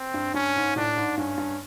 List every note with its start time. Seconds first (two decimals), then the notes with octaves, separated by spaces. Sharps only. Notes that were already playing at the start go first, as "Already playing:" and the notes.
Already playing: C4
0.14 G2
0.34 G2 C#4
0.56 G#2
0.76 A2 D4
0.96 G#2
1.18 G2 C#4
1.38 G2